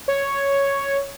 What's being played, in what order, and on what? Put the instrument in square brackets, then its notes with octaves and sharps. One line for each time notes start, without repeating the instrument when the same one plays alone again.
[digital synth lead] C#5